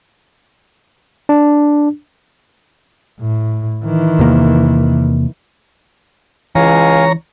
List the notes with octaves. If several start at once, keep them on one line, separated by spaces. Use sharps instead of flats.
D4
A2
D#3 E3
E2 C3 A#3
C#2 E3 C#5 F5 G#5 A#5